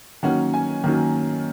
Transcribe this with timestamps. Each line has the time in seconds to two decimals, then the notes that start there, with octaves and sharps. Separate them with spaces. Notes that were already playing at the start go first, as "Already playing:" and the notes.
0.23 D#3 F#3 A#3 C#4 F#5
0.53 G#5
0.84 D#3 F#3 A#3 C#4